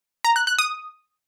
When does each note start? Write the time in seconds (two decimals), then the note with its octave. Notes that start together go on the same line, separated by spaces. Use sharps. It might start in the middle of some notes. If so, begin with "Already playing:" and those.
0.24 A#5
0.36 F#6
0.47 F#6
0.58 D#6